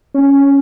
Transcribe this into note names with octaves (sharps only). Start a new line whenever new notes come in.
C#4